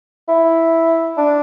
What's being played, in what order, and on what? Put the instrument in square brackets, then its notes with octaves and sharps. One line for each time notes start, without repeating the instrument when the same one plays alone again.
[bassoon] E4
D4